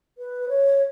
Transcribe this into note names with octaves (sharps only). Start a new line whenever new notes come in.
B4
C#5